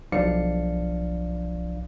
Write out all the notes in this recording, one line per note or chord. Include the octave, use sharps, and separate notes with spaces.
B1 F3 D4 D5 F5 C#7